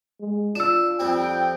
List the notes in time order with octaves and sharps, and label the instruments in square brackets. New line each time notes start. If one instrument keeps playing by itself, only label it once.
[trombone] G#3
[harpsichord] D4 [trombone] F4 [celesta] E6 E7
[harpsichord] F2 G3 C4 [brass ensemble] G5